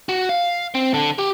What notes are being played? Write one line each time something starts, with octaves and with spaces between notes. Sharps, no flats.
F#4
F5
C4
D3
G4